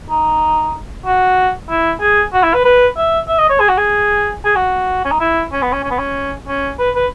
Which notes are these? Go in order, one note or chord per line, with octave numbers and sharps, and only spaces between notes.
D#4
F#4
E4
G#4
F#4
E4
B4
B4
E5
E5
D#5
C#5
G#4
F#4
G#4
G#4
F#4
C#4
D#4
E4
C#4
B3
C#4
C#4
B3
C#4
C#4
B4
B4